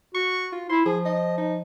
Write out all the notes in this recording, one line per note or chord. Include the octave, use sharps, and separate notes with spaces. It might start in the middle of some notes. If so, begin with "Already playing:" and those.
F#4 C#6
F4
E4 C6
F3 G#4
D#5
D#4